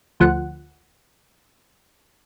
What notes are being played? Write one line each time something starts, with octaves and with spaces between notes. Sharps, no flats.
D2 F3 F#5